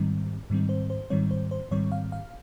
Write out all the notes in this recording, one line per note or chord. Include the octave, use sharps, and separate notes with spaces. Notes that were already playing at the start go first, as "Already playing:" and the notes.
Already playing: G#2 D#3 G3 C4
G#2 D#3 G3 C4
C5
C5
G#2 D#3 G3 C4 C#5
C5
C5
G#2 D#3 G3 C4 C#5
F5
F5